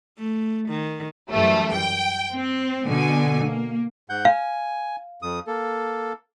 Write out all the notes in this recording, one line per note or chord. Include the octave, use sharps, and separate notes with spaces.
A3
D#3
F#2 E3 G3 A3
G5
C4
B2 D3 G#5
A#3
G#2 F#5 G6
F5 G#5
F2 D#6
A#3 A4